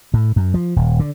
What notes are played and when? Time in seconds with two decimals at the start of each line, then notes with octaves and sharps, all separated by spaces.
0.14 A2
0.36 F#2
0.54 F3
0.76 D#1
0.99 D3